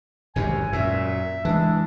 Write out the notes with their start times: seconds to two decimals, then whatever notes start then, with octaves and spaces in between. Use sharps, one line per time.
0.36 G#1 F#2 C3 G#5
0.73 F#2 A#2 E5
1.45 E3 G#3 D4